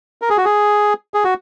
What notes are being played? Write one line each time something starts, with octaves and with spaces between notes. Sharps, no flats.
A#4
G#4
F#4
G#4
G#4
F#4